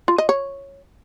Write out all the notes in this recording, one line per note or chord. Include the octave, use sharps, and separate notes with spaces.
F4
D#5
C#5